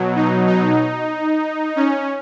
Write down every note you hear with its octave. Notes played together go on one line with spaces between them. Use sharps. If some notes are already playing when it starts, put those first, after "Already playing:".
Already playing: B2 F#3
D#4
D#4
C#4